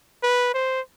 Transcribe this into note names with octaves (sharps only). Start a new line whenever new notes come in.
B4
C5